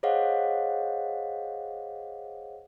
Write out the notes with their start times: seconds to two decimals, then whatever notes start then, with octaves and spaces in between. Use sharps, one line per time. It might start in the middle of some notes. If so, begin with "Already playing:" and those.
0.03 G#4 C5 C#5 D#5 F5 F#5